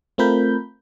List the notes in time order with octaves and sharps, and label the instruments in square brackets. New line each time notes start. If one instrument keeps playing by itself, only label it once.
[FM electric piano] A3 C4 F4 A#4 B5 G6